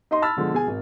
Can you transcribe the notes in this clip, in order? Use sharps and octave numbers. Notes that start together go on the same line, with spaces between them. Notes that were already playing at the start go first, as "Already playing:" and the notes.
D#4 D#5 C6
A5 B5 E6 F6 A6
B2 D3 F3 G#3
B2 G#4 G#5
G#1